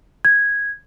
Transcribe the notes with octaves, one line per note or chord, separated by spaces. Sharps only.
G#6